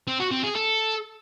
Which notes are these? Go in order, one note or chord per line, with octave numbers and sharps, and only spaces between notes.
C4
F#4
C4
G#4
A4